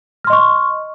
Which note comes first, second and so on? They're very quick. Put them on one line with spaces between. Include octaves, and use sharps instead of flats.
F6 C6 D#5 C#6